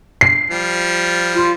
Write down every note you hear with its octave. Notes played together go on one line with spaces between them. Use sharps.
C7
F3 G3
F4